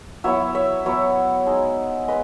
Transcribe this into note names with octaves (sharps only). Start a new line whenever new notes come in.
F#3 B3 E4 C#5 E5
C#5 E5
F#3 B3 E4 C#5 E5
G#3 D#4
G#3 B4 D#5